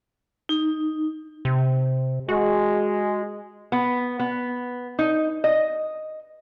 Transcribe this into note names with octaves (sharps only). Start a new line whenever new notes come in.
D#4
C3
G#3 F#4
B3
B3
D#4
D#5